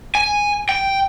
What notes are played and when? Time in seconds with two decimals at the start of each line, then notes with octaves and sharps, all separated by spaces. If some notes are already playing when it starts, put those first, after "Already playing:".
0.15 G#5
0.69 G5